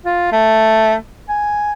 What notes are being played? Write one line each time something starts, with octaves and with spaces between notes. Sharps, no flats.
F4
A3
G#5